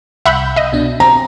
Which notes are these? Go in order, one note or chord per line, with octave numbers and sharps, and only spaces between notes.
C2 E5 F#5 B5 G6
C2 D#5 E5
B2 D4
C4 A#5